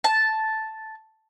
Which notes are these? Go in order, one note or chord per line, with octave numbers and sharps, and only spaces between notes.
A5